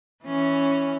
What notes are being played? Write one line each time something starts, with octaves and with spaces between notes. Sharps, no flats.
E3 C#4